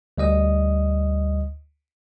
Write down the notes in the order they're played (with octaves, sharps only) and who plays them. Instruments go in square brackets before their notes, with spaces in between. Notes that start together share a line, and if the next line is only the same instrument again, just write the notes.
[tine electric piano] D2 G3 D#5 D#6